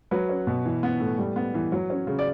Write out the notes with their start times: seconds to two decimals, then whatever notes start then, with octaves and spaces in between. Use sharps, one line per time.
0.11 F#3 B4
0.29 C#4
0.47 B2
0.65 E3
0.83 B3
1.00 A2
1.18 G3
1.36 B3
1.54 E3
1.72 F#3
1.90 C#4
2.07 C#3
2.19 D5